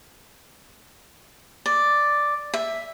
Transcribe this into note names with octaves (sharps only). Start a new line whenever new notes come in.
D5
E5